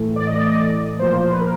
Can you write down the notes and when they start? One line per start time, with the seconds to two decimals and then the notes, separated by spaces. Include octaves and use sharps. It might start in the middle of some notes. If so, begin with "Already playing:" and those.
Already playing: A2 E3 A3
0.16 D5
0.27 D#5
0.36 D5
0.46 D#5
0.56 D5
0.99 A#2 F3 A#3 C5
1.21 C5
1.31 B4
1.41 A#4